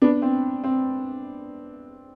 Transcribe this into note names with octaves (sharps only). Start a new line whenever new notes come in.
B3 D4
C4
C4